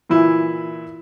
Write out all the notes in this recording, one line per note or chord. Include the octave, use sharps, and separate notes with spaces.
A#2 E3 E4